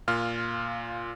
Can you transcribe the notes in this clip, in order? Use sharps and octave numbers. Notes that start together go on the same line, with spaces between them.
A#2 F4 F6